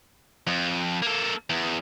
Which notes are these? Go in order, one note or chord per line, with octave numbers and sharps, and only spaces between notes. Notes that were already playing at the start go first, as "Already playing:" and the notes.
F2
A#3 A4
E2